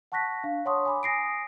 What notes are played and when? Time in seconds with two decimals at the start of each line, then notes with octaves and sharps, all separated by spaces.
0.12 F#5 A5 C#6 F#6 A#6 B6
0.44 D4 F5
0.65 C#5 F#5 A5 C6 C#6 D#6
0.86 G#5 B5 D6
1.03 G#5 D#6 A#6 C7 D7